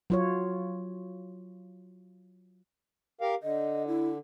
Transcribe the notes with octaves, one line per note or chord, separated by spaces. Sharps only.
F#3 F4 C#5
G4 A#4 F5
D3 D#5
E4